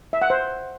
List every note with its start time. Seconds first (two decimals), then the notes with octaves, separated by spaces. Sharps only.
0.13 E5
0.22 F#5
0.30 C5